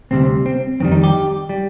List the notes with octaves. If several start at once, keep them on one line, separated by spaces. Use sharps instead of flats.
D2 C3 G3 C4
C4
F2 D#3 G3 C4
D#4
G4
G3